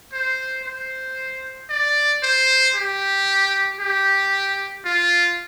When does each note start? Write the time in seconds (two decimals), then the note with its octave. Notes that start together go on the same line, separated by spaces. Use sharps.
0.13 C5
0.65 C5
1.70 D5
2.23 C5
2.75 G4
3.80 G4
4.85 F4